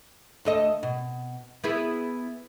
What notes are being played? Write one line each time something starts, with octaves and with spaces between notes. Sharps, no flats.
D2 A4 D#5
B2
B3 E4 G#4